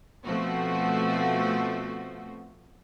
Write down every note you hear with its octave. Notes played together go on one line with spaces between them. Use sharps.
B2 F3 A3 C4 F#4